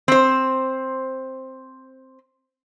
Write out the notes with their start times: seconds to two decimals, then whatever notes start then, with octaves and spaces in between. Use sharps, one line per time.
0.08 C4 C5